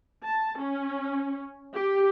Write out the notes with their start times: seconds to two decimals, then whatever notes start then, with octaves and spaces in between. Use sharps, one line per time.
0.24 A5
0.61 C#4
1.75 G4